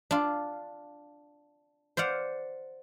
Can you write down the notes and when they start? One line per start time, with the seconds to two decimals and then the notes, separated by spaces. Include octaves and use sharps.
0.11 D4 F4
1.97 C5 D5 F5 F#5